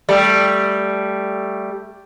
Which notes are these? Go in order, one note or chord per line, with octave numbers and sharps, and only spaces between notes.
G3 A3